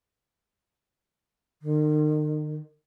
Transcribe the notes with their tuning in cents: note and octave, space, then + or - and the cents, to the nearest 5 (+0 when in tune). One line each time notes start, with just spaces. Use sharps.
D#3 -40